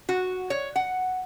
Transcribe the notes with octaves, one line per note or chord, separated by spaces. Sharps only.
F#4
C#5
F#5